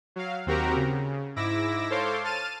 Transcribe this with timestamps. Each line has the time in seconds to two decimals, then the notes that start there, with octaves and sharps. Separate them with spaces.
0.16 F#3 F5
0.46 D#2 C4 F#4 G4 A#4 A#5
0.76 C#3
1.36 G#2 E4 D6 E6 A#6
1.90 A4 C5 C#5 F5 C6 D6
2.24 A5 F6 A6 D#7